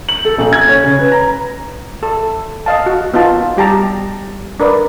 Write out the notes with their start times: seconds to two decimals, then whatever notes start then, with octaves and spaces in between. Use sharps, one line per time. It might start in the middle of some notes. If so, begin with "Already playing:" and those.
0.09 F#7
0.25 A4
0.38 A#1
0.53 G#6
0.68 C#4
0.84 C#3
0.99 B4
1.12 A#5
2.03 A4
2.66 D#5 F5 A5
2.86 F#4
3.14 B3 D#4 F4 A5
3.57 G3 G4 A5 A#5
4.60 D4 A#4 B4 D5